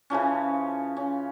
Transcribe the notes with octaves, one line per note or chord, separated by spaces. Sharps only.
C#3 E3 F3 C#4
C#4